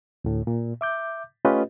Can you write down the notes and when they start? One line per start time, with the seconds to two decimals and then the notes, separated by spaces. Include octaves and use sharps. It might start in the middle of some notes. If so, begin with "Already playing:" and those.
0.24 D2 A2
0.47 A#2
0.81 E5 D6 G6
1.45 A3 C#4 F4 G4 B4 D#5